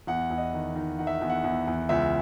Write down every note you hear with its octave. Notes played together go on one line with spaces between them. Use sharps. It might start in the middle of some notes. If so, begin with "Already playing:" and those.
E2 F#5
E2
D#5
D#3
D#3
D#3 F#5
E5
F#5
E2
F#5
E2
E2
C#2 E5